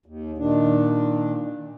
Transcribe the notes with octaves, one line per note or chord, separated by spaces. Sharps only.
D#2
A#2 D#3 D4